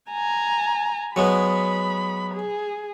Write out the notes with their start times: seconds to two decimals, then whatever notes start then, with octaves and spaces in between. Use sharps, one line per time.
0.11 G#5 A#5
1.16 F#3 G#3 B3 B5
2.35 G#4